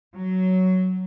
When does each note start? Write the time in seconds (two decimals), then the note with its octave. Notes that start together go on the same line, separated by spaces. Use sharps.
0.16 F#3